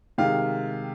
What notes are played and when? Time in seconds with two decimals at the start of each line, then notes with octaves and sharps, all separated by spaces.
0.18 C3 D#3 G#3 F5